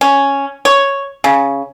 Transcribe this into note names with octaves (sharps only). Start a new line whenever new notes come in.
C#4
C#5
C#3